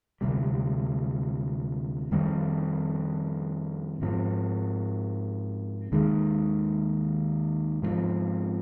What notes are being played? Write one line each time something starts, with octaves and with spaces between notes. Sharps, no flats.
D2 C3 G3
F2 D#3 G3 C4
G#2 F3 C4
D#2 D#3 G#3
G#2 F3 G#3 C4